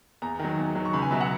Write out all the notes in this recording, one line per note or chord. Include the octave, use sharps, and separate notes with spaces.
E2 A#5
D#3 F#3
E2
D#3 F#3
C#6
C#2 B5
G#5
B2 F#3 E5
F#5